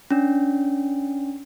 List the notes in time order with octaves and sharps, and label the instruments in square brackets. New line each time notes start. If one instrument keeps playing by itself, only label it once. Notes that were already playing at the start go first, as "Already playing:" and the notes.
[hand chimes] C#4 D4